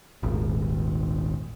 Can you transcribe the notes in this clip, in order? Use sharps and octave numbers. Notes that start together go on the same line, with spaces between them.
D#1 G#1